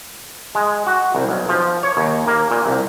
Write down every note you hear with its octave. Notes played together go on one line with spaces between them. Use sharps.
G#3
F#4
C2
B1
F3
C#5
D#2
A#3
A#2
C2